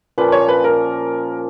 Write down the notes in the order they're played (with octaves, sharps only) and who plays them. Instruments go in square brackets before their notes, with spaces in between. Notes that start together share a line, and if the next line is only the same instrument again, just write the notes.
[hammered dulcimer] A#2 F3 A#3 C#4 [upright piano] B4
[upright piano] C#5
B4
A#4